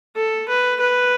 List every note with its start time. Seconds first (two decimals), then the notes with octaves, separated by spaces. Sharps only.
0.16 A4
0.48 B4
0.80 B4